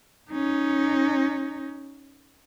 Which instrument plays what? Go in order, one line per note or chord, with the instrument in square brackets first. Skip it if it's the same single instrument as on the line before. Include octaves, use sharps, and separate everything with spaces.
[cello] C#4 D#4